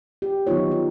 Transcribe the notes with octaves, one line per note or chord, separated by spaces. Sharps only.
G4
D#3 F#3 B3 D#4 F4 C#5
F4